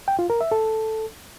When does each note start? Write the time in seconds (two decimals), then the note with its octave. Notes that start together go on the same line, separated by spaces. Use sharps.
0.08 G5
0.19 F4
0.30 A#4
0.41 E5
0.52 A4